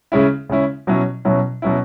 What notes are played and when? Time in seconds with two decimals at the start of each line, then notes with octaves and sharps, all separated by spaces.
0.12 C#3 G#3 C#4 E4
0.49 C#3 G#3 C#4 E4
0.87 B2 F#3 C#4 E4
1.25 B2 F#3 C#4 E4
1.62 B2 F#3 C#4 E4